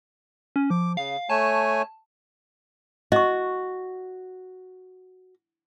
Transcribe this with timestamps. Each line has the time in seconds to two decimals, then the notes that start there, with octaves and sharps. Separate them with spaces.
0.56 C#4
0.70 F3 D6
0.97 C#3 F5
1.30 A3 C#5 G#5 A5
3.12 F#4 D#5 C#6